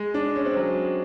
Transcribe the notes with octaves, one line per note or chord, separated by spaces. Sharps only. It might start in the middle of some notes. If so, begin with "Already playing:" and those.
Already playing: G#3
D4
C#4
C4
F#3